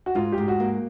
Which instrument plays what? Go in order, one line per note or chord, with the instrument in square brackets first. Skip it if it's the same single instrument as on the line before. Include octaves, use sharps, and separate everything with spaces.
[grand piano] F#4
[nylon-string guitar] G#2 [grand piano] F4
[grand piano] G4
[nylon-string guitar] G#2
[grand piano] F#4
[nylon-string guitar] A#3